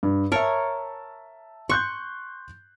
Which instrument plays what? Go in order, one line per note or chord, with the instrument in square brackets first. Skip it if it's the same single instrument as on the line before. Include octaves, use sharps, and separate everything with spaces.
[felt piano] G2
[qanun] A#4 C#5 [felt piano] E5 A5
[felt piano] C6 F#6 G6 [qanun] C#6